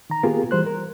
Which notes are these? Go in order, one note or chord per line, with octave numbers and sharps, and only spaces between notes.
D#3 A#5
A#3 B3 F4 G4 G#4 A#4
E3 G3 C5 F#6
A#4